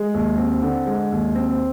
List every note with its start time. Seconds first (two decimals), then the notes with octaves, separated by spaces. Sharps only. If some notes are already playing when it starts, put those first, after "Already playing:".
Already playing: G#3
0.14 D#2
0.38 C4
0.62 D3
0.86 G#3
1.12 D#2
1.35 C4